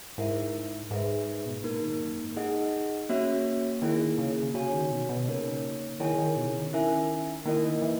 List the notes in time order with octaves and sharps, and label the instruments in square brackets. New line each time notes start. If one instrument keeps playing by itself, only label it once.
[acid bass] G#2 [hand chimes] E4 A#4 E5
[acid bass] G#2 [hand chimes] G#4 B4 E5
[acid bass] B2
A#2
[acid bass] G#2 [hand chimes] A#3 D#4 A#4
[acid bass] D#3
F#2
G#2
[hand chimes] D#4 G#4 D#5 F#5
A#3 C#4 F#4 C#5 E5
[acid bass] D#3 [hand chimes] A#3 E4 G#4
[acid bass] C#3
[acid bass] C#3 [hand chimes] F#4 C#5 G#5
[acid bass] D#3
B2
B2
[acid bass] C#3 [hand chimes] A#3 D#4 A#4 C#5
[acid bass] D#3 [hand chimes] E4 G#4 C#5 G#5
[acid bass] D#3
B2
C#3
D#3
[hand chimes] C#4 E4 A#4 E5 G#5
[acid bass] D#3 [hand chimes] A#3 E4 A#4 D#5
[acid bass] E3